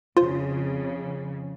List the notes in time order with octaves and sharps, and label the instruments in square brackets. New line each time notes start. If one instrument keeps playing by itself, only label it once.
[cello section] F2 C#3 [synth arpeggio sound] F4 C5